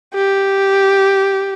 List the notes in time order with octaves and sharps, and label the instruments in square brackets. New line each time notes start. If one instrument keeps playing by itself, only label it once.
[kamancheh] G4